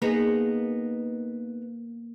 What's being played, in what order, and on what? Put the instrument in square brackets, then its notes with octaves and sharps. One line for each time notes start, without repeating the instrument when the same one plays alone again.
[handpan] A#3 [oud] B3 D#4 G#4